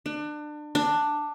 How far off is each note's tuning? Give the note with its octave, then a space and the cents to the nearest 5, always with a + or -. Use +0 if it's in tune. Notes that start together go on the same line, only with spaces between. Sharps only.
D4 +30
D4 +10